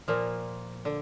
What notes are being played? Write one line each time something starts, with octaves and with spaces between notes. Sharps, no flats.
A#2 F3 A#3
D3